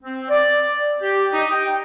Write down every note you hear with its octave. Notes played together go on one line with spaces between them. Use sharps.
C4
D5
G4
D#4
G5